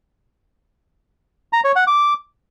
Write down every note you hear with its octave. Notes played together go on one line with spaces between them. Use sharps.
A#5
C#5
F#5
D6